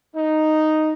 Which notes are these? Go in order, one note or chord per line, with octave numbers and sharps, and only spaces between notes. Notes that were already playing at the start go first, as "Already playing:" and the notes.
D#4